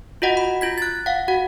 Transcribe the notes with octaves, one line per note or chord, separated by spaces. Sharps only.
F4 F#4 D#5 F#5
B5
F4 G#6 B6
F#6 A6
F5 F#5
F#4 F#5